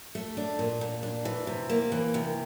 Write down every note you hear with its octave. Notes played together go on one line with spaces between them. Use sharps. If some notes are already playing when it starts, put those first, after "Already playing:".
A3
D4
A#2
A#2
D4
E3
C3
A#3
E3
C3